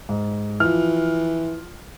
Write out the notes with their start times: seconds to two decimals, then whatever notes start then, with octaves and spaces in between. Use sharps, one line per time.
0.09 G#2
0.60 E3 F3 F6